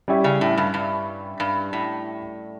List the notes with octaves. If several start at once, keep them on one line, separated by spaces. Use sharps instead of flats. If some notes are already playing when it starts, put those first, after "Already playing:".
G3 C#4 E4 G4
C#3
A2
G2
G2
G2
A2